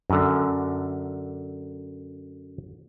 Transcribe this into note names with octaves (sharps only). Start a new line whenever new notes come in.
F#2 D3